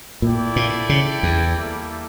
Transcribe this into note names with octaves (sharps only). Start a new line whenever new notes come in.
A#2 E4 A4 D5 G5
A#2
C#3
E2
G3 A#3 E4 A4 E5